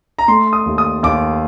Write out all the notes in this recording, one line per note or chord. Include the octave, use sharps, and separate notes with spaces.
A#5
A3 C6
D#6
D#2
D#6
D#2 D6